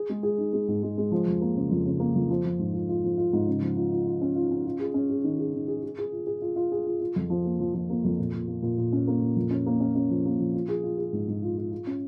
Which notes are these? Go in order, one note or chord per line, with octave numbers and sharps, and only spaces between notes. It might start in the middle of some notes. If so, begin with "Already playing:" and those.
Already playing: G#4
G#3
G#4
D#4
G#3
G#2
G#3
G#3
F3
F2
A#3
C#3
F2
C#3
A#3
F2
F3
F3
G#2
F4
F4
F3
F4
G#2
C#3
F3
F4
F4
F4
C#4
F4
C#4
F4
G#4
C#4
G#4
D#3
G#4
D#3
G#4
G#4
G#4
F4
G#4
F4
F4
G#4
F4
F4
F2
F3
A#3
F3
F3
A#3
F2
A#2
A#2
A#3
A#2
A#2
C#4
A#3
A#2
F2
C#4
A#3
C#4
C#4
F3
A#3
F3
F4
G#4
F4
G#4
G#2
G#2
F4
F4
F4
C#4